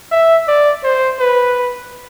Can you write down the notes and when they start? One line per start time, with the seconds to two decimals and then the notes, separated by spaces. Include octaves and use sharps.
0.12 E5
0.48 D5
0.84 C5
1.20 B4